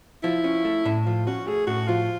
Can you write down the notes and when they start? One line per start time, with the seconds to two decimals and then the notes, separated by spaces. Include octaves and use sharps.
0.23 F3 E4
0.44 C#4
0.65 A3
0.85 A2
1.06 F3 F4
1.27 C#4 F#4
1.47 A3 G#4
1.67 A2 F#4
1.88 F3 F4